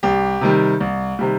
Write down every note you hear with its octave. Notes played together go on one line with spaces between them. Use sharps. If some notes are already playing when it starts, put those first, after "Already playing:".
C2 G4
C3 D#3 G3
C2
C3 D#3 G3